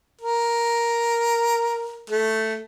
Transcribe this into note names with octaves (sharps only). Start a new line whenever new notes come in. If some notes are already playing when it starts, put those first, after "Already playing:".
A#4
A3